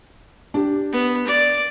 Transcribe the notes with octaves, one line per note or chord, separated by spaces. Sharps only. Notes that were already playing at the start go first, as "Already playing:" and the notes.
D4 G4
B3
D5